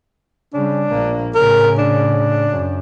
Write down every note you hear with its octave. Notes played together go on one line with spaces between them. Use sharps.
C#3 G3 D4
A#1 A#3
A2 C#3 A#4
D4
F#2